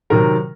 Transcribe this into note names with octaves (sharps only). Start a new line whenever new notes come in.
C3 D#3 F#3 A#4